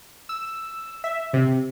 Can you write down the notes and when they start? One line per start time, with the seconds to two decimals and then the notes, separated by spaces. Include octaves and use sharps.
0.29 E6
1.04 E5
1.33 C3